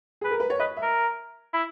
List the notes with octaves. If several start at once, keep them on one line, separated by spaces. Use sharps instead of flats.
G#4 B4
A#4
B4
C#5
B4 D#5
E5
A#4
E4